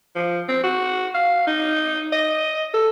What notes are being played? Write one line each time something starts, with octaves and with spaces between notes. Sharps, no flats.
F3
C4
F#4
F5
D#4
D#5
A4